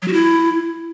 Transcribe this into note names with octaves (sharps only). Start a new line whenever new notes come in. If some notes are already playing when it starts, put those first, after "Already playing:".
F#3
F#4
E4